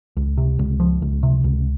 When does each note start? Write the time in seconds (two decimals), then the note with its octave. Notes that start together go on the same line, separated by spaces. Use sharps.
0.17 C#2
0.37 C3
0.59 C#2
0.80 F3
1.02 C#2
1.23 C3
1.44 C#2